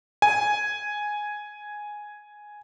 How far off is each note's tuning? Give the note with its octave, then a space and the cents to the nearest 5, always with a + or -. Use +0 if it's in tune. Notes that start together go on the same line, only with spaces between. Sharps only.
G#5 +0